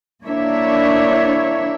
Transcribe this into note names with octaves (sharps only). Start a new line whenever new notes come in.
A#3 D4 E4 C#5 E5